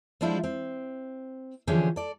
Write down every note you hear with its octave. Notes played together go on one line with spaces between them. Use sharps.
F3 G3 G#3 D4 E4 F4
C4
D3 E3 F3 C#4 G4 G#4
A4 D5